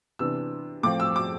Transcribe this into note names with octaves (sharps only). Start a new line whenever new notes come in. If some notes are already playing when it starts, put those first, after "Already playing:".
C3 E3 B3 D4 E6
A2 F3 C4 D6
E6
D6